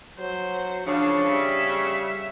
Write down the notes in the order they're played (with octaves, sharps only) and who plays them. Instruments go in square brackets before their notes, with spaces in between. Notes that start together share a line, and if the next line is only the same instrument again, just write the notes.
[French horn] F#3 [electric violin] C5
[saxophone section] C#3 [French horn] F3 [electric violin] D4
[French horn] G3 [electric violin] E5